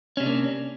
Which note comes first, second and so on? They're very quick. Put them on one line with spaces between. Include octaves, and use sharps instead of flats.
C#4 C3 D4 A#3